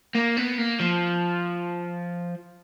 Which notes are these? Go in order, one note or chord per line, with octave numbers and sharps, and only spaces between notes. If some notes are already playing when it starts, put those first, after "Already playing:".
A#3
B3
A#3
F3